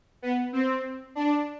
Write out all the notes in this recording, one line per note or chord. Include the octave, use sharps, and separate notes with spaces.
B3
C4
D4